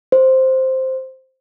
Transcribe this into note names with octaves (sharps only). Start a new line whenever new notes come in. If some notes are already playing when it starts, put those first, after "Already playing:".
C5